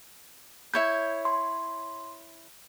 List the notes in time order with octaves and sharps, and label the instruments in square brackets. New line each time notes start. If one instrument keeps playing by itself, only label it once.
[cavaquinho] E4 C#5 B5 [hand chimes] G6
[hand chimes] C6